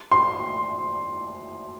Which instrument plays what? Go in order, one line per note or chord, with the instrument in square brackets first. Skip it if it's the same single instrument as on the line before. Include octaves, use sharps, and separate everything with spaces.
[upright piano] C6